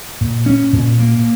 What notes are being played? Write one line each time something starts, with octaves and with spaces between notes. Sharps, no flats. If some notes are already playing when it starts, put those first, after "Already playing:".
A#2
C#4
A#2
A#3